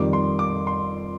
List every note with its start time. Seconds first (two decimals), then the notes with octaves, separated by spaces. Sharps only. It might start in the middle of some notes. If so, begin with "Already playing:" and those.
Already playing: F2 D#3 G3 D6
0.13 C6
0.39 D6
0.67 C6